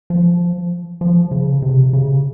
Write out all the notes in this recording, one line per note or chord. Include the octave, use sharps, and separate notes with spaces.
F3
F3
C#3
C3
C#3